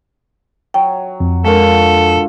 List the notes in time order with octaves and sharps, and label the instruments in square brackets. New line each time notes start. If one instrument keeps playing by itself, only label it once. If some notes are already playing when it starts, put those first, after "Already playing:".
[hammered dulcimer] F#3 [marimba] G5
[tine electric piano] F2
[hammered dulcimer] D3 F4 F#4 [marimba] G#3 A#4 [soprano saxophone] A4